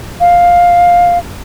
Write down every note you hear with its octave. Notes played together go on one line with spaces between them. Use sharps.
F5